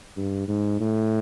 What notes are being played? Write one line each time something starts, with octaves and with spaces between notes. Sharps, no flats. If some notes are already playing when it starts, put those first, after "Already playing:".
G2
G#2
A2